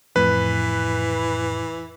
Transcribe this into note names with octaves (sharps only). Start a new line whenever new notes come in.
F2 A2 E3 B4